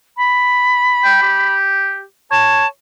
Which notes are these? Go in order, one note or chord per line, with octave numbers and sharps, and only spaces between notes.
B5
G5
G4
C#5 A5